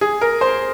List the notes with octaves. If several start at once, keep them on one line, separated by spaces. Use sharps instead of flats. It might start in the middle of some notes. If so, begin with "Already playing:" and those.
G#4
A#4
C5